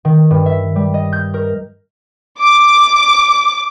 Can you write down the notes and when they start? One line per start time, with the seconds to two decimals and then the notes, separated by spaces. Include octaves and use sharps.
0.05 D#3
0.30 G2
0.46 E5
0.76 G3
0.94 D#5
1.13 G6
1.34 A#4
2.40 D6